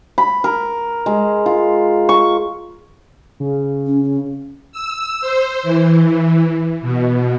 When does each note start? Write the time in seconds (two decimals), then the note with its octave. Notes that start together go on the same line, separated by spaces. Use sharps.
0.18 B5
0.44 A#4
1.06 G#3
1.46 F4
2.09 C#6
3.40 C#3
3.86 C#4
4.04 C#4
4.72 E6
5.21 C5
5.63 E3
6.82 B2